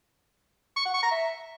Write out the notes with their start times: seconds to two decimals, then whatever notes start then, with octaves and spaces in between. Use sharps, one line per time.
0.76 C#6
0.85 F#5
0.94 C#6
1.03 A#5
1.11 E5